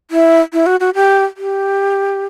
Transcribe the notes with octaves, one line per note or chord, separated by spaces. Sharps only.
E4
E4
F#4
F#4
G4
G4